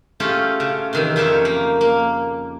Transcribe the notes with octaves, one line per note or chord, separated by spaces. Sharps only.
A3 C#4 F4 G4 G#4
C#3
C3 D#3 E3
F2 C#3 D#4 G4 C#5 E5
A#3
A#3